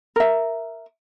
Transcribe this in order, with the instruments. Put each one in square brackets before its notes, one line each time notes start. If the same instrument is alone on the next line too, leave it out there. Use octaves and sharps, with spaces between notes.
[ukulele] A#4 E5